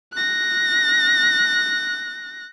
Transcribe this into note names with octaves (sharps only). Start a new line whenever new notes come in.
F#6 A#6